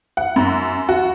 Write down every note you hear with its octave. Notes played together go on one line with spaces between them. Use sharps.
F#5
F#2
F#4